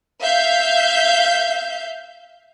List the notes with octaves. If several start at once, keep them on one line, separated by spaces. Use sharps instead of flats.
E5 F5 G6